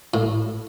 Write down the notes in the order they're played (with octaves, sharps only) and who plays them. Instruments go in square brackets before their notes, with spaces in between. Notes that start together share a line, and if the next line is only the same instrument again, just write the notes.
[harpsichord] A2